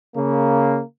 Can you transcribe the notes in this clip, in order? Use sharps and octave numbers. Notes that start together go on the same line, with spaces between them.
C#3 A#3